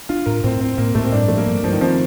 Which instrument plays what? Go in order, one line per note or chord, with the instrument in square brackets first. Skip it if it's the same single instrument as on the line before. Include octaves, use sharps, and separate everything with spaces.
[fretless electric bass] D4 [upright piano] F4
[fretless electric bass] A2 [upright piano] A#4
[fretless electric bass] A2 [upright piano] C4
[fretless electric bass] A2 [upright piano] C4
[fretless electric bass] A2 [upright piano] A#3
[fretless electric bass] A2 [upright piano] A3
[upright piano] C4
[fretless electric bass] G2 [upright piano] D4
[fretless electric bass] F3 [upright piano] A3
[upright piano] A#3
[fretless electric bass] G2
[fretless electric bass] G2 [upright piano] F3
[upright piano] D#3
[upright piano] F3 [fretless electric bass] C4